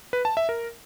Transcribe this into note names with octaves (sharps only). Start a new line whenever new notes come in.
B4
A5
E5
A#4